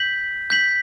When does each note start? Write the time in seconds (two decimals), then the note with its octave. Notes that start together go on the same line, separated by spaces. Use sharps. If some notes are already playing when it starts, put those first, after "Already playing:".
Already playing: G6 B6 F#7
0.50 G6 B6 F#7